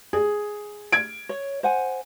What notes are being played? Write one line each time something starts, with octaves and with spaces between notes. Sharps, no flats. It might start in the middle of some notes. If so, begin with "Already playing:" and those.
G#4
G#6 D7
C#5
C5 F#5 G#5